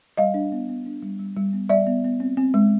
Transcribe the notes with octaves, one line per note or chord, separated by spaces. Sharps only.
G3 D#5 F5
D4
B3
B3
D4
G3
G3
G3
B3
G3 D5 E5
B3
B3
C4
C4
G#3